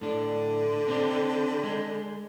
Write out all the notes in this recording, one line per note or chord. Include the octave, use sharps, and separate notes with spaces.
A2 D3 D4
C4 D4 G4
G#3